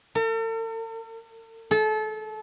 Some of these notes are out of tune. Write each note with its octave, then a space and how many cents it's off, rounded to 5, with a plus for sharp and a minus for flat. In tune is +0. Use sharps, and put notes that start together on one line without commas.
A4 +45
A4 -30